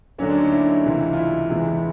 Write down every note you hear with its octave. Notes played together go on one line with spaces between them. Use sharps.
D2 D3 F#3 A#3 C#4
D4
D#4
E4
C#2 C3 E3
F4
E4
E2 C3 E3 G#3 B3